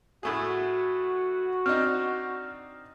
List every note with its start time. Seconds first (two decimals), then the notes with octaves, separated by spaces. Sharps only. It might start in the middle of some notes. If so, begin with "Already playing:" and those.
0.23 A2 A3 F#4 G#4
1.66 C4 D4 D#4 F6